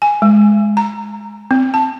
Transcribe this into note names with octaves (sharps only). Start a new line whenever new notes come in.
G#5
G#3
A#5
C4
A5